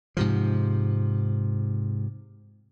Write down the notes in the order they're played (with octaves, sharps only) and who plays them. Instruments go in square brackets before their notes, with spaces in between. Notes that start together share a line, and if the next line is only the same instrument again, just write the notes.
[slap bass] G#2 C3 F3